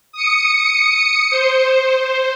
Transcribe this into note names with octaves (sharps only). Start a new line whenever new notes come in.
D#6 C#7
C5